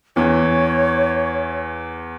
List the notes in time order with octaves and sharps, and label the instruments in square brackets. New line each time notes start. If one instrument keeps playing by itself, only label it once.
[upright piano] E2 E3 [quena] C#5